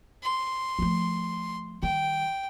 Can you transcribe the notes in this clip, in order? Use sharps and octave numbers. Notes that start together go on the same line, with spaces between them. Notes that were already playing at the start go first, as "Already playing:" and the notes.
C6
F3 A3
D#3 G3 G5